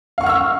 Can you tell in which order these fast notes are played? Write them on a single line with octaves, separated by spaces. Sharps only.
F5 C#6 F#5 F6 E6